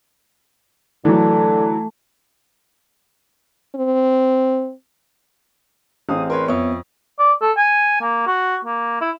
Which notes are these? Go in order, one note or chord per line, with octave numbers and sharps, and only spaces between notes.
D3 E3 F#3 A3
C4
A1 C4 G#4 F5 D#6
A#4 B4 C#5 C6
F2 B3 C#5 E5 C#6
D5
A4
G#5
A#3
F#4
A#3
E4